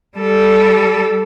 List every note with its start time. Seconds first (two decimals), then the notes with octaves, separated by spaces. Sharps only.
0.18 G3 A4